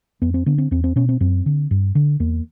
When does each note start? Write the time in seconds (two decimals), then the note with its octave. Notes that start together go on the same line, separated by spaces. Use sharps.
0.22 F2 B3
0.34 C4
0.46 D3 B3
0.58 C4
0.71 E2 C4
0.84 C4
0.96 B2 C#4
1.09 C4
1.20 F#2 C4
1.46 D3
1.71 G2
1.95 D3
2.20 E2 A#3